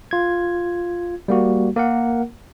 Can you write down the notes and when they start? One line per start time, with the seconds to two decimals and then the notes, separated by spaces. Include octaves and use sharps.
0.11 F4 G#6
1.28 G3 A#3 F#4
1.76 A#3 A#4 F#5